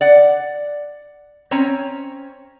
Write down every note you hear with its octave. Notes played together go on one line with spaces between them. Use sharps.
D5 F#5
C4 C#4 C#5 A#5